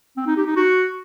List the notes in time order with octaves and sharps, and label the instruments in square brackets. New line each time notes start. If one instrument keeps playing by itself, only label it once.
[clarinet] C4
D#4
G4
D#4
F#4